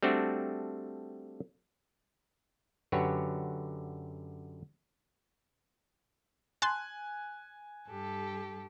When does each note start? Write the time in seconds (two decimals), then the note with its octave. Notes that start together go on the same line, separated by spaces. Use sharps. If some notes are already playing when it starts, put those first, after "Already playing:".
0.03 G3 A3 C4 D4 F#4
2.92 F#2 D3 F#4 G4 B4 C#5
6.62 G#5 A5 C6 F#6
7.89 G2 G4 A4